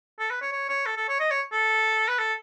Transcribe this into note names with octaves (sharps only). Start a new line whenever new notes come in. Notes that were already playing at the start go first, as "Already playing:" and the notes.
A4
B4
C#5
C#5
C#5
A4
A4
C#5
D#5
C#5
A4
B4
A4